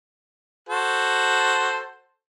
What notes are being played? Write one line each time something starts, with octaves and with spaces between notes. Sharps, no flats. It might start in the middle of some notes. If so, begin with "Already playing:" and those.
F#4 A4 C5